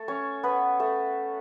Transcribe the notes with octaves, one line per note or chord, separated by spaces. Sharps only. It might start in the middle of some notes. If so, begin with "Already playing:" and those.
Already playing: A3 A4
C#4 C#5
B3 B4
A3 A4